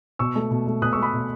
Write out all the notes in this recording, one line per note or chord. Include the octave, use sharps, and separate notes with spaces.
B2 C#6 E6
A3
B2
A3
B2 D#6 F#6
C#6 E6
A3
B5 D#6
B2